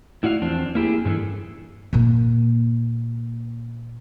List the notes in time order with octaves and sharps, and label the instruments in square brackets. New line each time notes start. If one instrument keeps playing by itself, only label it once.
[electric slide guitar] A2 E4 F#4 D5 E5 F5
E2 F3 C4 D4
A#3 E4 G4 G#4
G2 E3 C4 G#4 A4
[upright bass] A#2 A#3